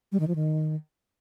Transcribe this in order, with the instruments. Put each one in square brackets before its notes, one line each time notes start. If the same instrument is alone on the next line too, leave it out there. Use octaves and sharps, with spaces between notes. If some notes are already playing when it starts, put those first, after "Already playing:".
[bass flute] G3
D#3
F3
D#3